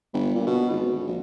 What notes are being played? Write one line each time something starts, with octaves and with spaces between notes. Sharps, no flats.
G1
A#2
B2
G#1
D2
A#1